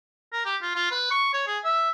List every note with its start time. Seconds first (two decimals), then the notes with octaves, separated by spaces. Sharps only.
0.33 A#4
0.45 G4
0.62 F4
0.76 F4
0.92 B4
1.11 C#6
1.34 C#5
1.47 G#4
1.65 E5